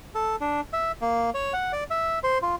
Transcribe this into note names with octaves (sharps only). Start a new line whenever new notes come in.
A4
D4
E5
A#3
C#5
F#5
D5
E5
C5
F4